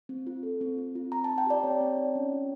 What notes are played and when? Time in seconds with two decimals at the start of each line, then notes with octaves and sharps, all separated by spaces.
0.09 C4
0.27 F4
0.43 A4
0.61 C4
0.78 C4
0.95 F4
1.12 C4 A#5
1.24 D#4 A5
1.38 G5
1.46 G4 D5
1.63 C4 C#5
1.81 C4
1.98 D#4
2.15 C#4
2.32 F4